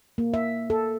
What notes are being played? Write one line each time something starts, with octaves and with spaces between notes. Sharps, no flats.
A#3
E5
A4